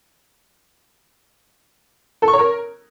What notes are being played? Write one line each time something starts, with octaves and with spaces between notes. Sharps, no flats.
A4
C#6
C#5
A#4